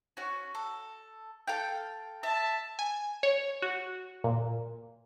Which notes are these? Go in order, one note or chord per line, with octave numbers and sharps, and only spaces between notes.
C#4 F#4
A4
A4 F5 G5
E5 A5
G#5
C#5
F#4
A#2